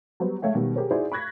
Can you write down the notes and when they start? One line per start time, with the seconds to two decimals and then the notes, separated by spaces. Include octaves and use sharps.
0.20 F#3 G3 B3 C5
0.42 G#3 A3 C#5 F5 G5
0.55 B2 D#3 G3
0.76 G4 G#4 A#4 C5 C#5
0.91 D#4 E4 F#4 G#4 C5 D5
1.12 B5 C#6 F#6 G#6 A#6 B6